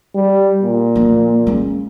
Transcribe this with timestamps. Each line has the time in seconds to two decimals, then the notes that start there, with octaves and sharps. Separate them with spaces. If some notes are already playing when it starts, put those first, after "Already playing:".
0.15 G3
0.62 A#2
0.95 F3 A#3
1.47 G#3 C#4